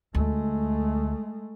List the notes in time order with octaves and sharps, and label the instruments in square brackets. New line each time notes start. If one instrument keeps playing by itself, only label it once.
[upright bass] D2 [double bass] G#3 A3